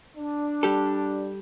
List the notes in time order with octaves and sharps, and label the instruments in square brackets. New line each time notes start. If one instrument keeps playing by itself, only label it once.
[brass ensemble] D4
[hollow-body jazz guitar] G3 G4 A4